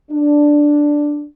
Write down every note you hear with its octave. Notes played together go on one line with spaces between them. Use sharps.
D4